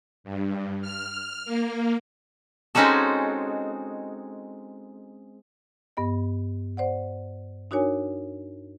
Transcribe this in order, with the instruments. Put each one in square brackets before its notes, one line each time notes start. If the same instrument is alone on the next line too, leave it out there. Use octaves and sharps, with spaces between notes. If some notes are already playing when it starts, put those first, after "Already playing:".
[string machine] G2
F6
A#3
[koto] G#3 C4 C#4 D#4 F#4 A4
[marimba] G2 B3 D#5
C5 D5 F#5
D4 D#4 F#4 A#4 C#5 G#5